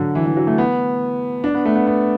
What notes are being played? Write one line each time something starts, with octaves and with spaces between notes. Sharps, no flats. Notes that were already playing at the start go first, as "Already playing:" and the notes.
Already playing: D3 F#3
E3
E3
F#3
A3
B3
D4
B3
A3
B3
B3